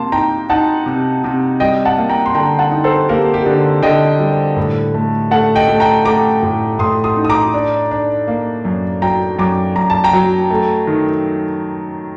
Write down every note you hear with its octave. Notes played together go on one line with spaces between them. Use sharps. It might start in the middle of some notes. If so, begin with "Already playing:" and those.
Already playing: C3 A#3 A5 C6
D#4 G5 A#5
D#4 F#5 A5
C3
C3
G3 D#5 G5
F#5 A5
A#3
G5 A#5
C6
D3 G5 A#5
F#5 A5
D#4
A4 C5
A#3 G4 A#4
G4
D3
D3 D#5 G5
G3
A2
A3
A3 F#5 A5
D#5 G5
A3
G5 A#5
A3 A#5 D6
A2
A2 C6 D#6
C6 D#6
D#4
D#6
A#5 D6
D4
D4
A#3
F#2
F#3 G5 A#5
F#2 A#5 D6
F#2 A#5
A5
G5 A#5
F#3
A3
D#3